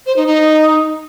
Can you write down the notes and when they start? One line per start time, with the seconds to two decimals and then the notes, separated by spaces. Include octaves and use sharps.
0.06 C5
0.16 D#4
0.26 D#4